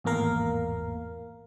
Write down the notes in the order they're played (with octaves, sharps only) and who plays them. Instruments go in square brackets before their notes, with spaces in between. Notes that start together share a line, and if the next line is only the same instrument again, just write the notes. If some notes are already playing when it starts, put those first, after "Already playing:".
[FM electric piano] G#1 E2 A2 A#3 A#4 F5